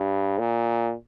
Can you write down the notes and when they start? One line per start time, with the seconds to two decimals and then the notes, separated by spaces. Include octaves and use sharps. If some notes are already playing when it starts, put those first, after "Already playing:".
Already playing: G2
0.39 A#2